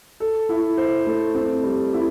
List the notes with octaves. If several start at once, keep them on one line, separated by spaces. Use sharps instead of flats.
A4
E4
C5
A3
C4
G3
E4